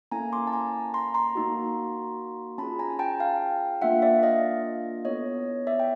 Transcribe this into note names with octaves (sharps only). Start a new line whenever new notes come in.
A#3 C#4 E4 A4 G#5 A#5
C6 D6
A5
G#5 A#5
A#5 C6
A#5 C6
A#3 D#4 F#4
C#4 F4 G#4 A5 B5
G#5 A#5
G#5
G5 A5
F5 G5
A#3 D4 F4 E5 F#5
D5 E5
D#5 F5
B3 E4 A4 C#5 D#5
D5 E5
G5